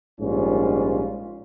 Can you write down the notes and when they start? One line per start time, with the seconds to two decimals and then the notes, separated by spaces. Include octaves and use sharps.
0.20 A#1 G#2 G3 C#4 F4